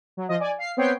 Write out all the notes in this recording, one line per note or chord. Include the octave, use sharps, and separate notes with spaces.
F#3
F3 D#5
D5 G#5
F5 C7
B3 C4 C#5 G5 C7